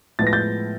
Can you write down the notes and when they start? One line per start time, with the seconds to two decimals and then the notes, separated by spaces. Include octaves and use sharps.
0.19 A2 F3 G#3 B3 A6
0.27 A#6
0.33 G6 A6